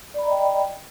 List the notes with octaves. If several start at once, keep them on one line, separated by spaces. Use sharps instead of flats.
D5 D#5 G5 A#5 B5